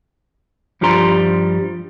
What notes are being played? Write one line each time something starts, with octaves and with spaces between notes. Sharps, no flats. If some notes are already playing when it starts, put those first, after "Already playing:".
G2 F3 G3 G4 A#5 C6